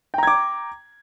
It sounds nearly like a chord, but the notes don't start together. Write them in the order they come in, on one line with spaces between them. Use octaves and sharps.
G5 A#5 G#6 D6